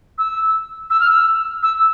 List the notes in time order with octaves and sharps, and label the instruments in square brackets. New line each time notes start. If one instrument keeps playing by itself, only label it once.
[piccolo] E6
E6
F6
E6
E6